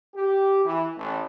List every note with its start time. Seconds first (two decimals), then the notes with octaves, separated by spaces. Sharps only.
0.14 G4
0.65 E3
0.96 A1